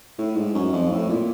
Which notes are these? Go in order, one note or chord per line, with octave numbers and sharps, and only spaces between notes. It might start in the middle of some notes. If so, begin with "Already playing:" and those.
A2
G#2
F#2
F2
A2
A#2